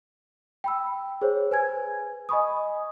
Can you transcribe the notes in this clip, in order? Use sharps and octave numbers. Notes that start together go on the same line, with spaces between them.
G5 B5 E6
G#4 C5 C#5
B4 G#5 G#6
D#5 G#5 B5 C#6 D#6